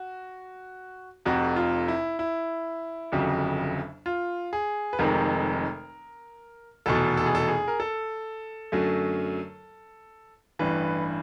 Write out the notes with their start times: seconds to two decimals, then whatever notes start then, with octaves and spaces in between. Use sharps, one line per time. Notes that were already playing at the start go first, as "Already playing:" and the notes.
Already playing: F#4
1.25 F1 F2 C3 F#4
1.56 F4
1.88 E4
2.19 E4
3.12 G1 F2 C#3 F#3
4.06 F4
4.53 G#4
4.93 B4
4.99 F1 F2 C3 D#3 G#3 A#4
6.86 F1 E2 B2 A4
7.17 A4
7.26 G#4
7.35 A4
7.48 G#4
7.68 A#4
7.80 A4
8.72 F#2 D3 F#3 A3
10.59 A1 G2 E3 B4